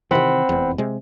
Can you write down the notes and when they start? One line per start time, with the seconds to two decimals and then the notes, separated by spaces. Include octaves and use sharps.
0.11 C3 D#3 E3 C4 F#5 B5
0.49 F1 E2
0.78 C3 G#3